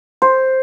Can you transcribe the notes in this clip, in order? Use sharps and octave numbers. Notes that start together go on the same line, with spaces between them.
C5